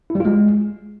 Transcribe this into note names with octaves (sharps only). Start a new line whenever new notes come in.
E4
G3
F4
G#3